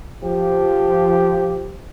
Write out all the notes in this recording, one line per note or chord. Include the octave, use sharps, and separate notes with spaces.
F3 G4